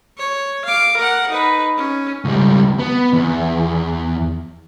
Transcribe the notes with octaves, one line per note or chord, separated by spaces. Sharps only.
C#5
F5 D6
A#4 F#5
D#4 B4
C#4
C#2 G3
B3
E2